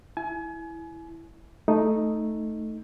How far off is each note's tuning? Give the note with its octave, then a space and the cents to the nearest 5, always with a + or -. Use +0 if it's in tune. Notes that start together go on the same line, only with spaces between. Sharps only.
E4 +0 G#5 +30
A3 +0 D#4 +0